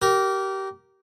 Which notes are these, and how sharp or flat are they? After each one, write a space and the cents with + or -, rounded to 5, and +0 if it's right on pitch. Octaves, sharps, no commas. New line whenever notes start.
G4 -25 A#4 +0